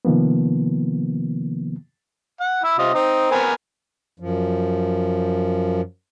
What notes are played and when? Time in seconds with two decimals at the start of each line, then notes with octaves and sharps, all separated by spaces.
0.05 C3 D#3 F3 A#3 B3
2.40 F#5
2.64 E4 E6
2.78 C3 F4 D#5
2.94 C4 D#4
3.32 B3 A#4 G#5
4.20 F#2 F3